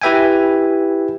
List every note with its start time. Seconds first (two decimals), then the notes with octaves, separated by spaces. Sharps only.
0.02 E4 G4 B4 E5 G5 G#5